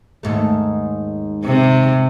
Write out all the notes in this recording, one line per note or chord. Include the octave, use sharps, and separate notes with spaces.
D#2 G#2 A3
C3